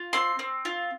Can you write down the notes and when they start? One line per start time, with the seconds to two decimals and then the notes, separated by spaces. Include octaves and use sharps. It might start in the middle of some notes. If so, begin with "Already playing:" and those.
Already playing: F4
0.13 C4 C6
0.39 C4
0.65 F4